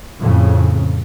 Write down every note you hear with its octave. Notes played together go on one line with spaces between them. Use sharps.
F2 A2 C#3